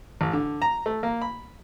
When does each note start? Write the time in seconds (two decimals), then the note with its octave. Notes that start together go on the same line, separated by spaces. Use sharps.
0.21 A1
0.33 D3
0.62 A#5
0.86 A3
1.03 A#3
1.22 B5